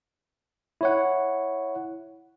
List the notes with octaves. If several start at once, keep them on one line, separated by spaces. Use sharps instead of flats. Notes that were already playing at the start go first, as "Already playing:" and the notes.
E4 C#5 F#5